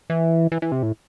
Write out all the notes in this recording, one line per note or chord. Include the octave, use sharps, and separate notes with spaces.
E3
E3
E3
C3
A2